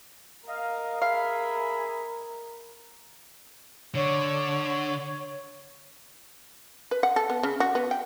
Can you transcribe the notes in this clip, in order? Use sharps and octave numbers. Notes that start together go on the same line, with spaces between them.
A#4 D#5 F5
G#4 E5 F5 B5
D3 C#5
B4
F#5
A4
B3
C#3
F#4
B3
G5